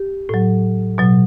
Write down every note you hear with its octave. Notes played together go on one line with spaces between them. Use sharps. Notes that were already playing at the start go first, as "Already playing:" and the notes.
Already playing: G4
A2 F#3
B2 F#3